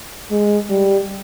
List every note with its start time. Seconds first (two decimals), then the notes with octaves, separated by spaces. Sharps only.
0.31 G#3
0.70 G3